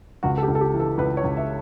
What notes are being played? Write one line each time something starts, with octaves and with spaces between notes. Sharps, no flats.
C#2 F#4
A4
G4
C#2
A4
G4
E3
A4
C#2 B4
C#5
C#2
E5